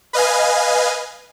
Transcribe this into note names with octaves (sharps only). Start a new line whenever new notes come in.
B4 D#5 F5 G#5